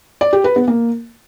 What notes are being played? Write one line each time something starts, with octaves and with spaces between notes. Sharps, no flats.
D5
G4
B4
B3
A#3